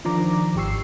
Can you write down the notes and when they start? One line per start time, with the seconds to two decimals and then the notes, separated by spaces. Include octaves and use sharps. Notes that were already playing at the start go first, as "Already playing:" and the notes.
0.05 D#3 F3 D4 A#5 D6
0.56 G#1 G4 C#6 E6 C7